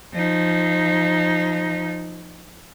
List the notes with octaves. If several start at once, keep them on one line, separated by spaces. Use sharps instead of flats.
F3 D#4